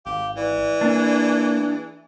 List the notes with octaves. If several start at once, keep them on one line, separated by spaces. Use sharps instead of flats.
G#1 G4 F5
E3 D5
A#3 D4 G#4